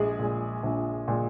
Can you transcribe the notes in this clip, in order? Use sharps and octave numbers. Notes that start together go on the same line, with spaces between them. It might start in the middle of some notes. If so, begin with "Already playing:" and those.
Already playing: A#1 G#3 G#4
A#2 G#3
A#1
A#2 G#3